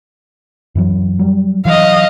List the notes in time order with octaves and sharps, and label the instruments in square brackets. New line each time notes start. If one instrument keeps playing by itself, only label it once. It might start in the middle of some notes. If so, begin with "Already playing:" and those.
[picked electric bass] F#2 E3 F#3
F#3 G3
[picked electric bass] E3 F#3 [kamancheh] D#5 F5